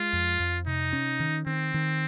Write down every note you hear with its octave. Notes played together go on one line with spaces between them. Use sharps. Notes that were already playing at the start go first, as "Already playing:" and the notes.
Already playing: G#3 F4
F2
F2
C3 D#4
C#4
D#3
D#3 C4
D#3